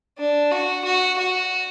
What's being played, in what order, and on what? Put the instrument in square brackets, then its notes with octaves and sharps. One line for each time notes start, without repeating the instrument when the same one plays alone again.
[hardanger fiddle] D4
F#4
F#4
F#4